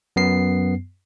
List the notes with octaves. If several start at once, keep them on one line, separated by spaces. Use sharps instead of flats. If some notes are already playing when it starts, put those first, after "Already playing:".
F#2 B3 C7